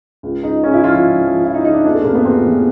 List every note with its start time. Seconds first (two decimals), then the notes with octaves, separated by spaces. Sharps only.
0.23 C#2
0.43 C#3 D#4
0.64 C#3 C#4
0.74 E4
0.83 F3 F4
0.94 F4
1.04 C#2
1.24 F3
1.44 F3 E4
1.54 D#4
1.64 C#3 D#4
1.74 D4
1.84 E2 D4
1.95 A3
2.04 C3 A#3
2.15 B3
2.25 E2 C4
2.45 E2